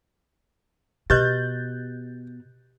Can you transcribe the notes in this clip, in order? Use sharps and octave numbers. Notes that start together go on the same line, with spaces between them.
B2 G4 B4 D#5 F#6 G6 A6